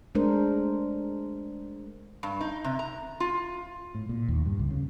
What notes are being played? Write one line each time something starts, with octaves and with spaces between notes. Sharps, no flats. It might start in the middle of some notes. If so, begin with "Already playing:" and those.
G#3 A3 D4 A#4 C5
G2
D#4
C3
A#5
F4
A2
A#2
D#2
G2
C#2
C#3